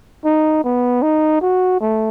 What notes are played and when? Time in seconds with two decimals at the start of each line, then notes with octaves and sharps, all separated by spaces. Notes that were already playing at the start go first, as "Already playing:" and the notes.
0.25 D#4
0.64 B3
1.02 D#4
1.41 F#4
1.80 A3